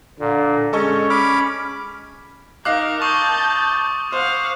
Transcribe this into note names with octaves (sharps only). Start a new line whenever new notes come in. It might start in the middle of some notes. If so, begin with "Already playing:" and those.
A#2 D3
G#3 C#4 A4 D#5 C#6
B5 D6 F6
D#4 A#4 D#5 F5 D6 F#6
A5 C#6 D#6 G6
C5 F5 F#5